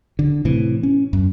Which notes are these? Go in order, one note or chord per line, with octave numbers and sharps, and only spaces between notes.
D3
A2 C3 E3
C#4
F#2